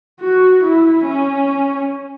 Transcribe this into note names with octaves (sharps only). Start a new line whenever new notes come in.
F#4
E4
C#4